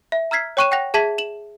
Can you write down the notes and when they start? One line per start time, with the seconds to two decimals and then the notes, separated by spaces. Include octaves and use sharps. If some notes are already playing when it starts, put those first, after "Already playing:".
0.12 E5
0.31 A#5 E6 F6 G#6 B6 C7
0.57 C#5 G5 C#6 F#6 D#7 E7
0.71 F#5 G5 F#6 A#6 F7
0.94 G#4 E5 A5 G#6 B6 F#7
1.18 E7 F#7